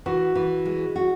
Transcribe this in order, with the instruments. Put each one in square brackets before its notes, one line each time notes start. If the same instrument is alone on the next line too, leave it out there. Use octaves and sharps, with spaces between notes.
[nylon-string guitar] E3 [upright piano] F#4
[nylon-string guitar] E3
G#3
F#4